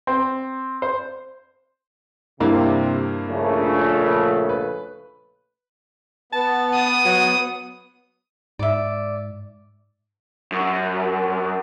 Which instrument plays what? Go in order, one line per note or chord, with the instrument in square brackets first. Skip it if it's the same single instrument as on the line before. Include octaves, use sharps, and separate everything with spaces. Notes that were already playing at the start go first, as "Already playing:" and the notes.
[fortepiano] C4
C5
[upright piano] G2 A#3 E4 [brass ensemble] C3
[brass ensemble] A#1 C#3 A3
[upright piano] B4
[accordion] B3 [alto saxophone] A5
[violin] D#6
[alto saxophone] F#3
[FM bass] G#2 [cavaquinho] D5 E5
[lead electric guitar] F#2